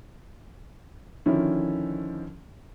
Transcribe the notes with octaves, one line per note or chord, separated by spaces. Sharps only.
D3 D#3 F3 C#4 E4